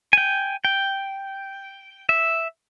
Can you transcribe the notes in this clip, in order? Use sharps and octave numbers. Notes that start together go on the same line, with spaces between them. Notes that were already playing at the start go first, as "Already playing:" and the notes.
G5 G#5
G5
E5